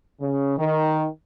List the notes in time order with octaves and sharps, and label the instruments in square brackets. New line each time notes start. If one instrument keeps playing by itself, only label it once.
[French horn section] C#3
D#3